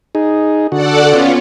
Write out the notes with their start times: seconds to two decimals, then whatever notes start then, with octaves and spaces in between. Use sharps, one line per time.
0.15 D#4 G#4
0.72 D3 F#4 A4 D5 F#5
1.07 B3 C#4 F4